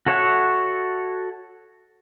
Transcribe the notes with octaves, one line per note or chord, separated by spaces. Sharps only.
F#4 A4 C#5 E5 F#5